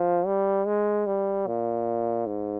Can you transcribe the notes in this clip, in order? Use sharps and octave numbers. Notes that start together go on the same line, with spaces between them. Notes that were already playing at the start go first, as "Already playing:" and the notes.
Already playing: F3
G3
G#3
G3
A#2
G#2